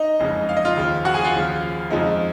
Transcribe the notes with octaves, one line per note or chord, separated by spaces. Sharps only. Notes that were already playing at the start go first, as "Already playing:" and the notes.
Already playing: D#4 D#5
F#1 F2 C#3 G#3
F5
D#5
F4 F5
D#2 C#3 F3
F#4 F#5
G#4 G#5
F4 F5
D#2 C#3 F3
F2 C#3 F3 G#3 D#4